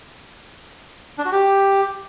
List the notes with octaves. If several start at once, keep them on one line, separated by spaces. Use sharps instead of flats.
D4
F#4
G4